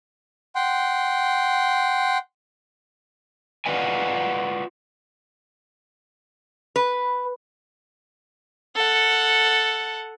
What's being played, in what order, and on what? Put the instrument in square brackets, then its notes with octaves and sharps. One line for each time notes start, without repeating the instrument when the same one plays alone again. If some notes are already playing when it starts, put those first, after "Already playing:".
[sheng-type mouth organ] F#5 G5 C6
[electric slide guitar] F4 F#4 B4 D5 D#5 G#5
[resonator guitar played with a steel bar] B4
[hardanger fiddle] A4 F#5